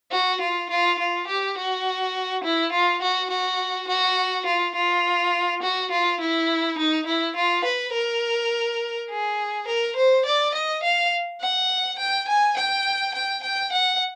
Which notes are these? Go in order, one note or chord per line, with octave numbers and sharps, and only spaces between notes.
F#4
F4
F4
F4
G4
F#4
E4
F4
F#4
F#4
F#4
F4
F4
F#4
F4
E4
D#4
E4
F4
B4
A#4
G#4
A#4
C5
D5
D#5
F5
F#5
G5
G#5
G5
G5
G5
F#5